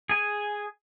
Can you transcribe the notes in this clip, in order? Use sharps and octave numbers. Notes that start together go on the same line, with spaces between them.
G#4 G#5